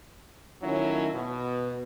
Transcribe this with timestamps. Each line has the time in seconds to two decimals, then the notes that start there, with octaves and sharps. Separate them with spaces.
0.63 D#3 F#3 A3 C#4 E4 F4
1.13 B2